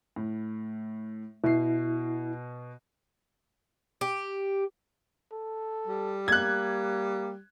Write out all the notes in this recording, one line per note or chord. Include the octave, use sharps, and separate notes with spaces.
A2
B2 E4 C7
G4
A4
G3
A#3 F#6 G#6